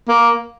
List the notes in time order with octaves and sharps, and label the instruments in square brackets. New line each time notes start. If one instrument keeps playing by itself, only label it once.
[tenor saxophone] A#3